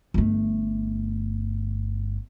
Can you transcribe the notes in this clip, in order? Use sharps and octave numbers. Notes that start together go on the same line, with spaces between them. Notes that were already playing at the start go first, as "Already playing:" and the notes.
G1 A3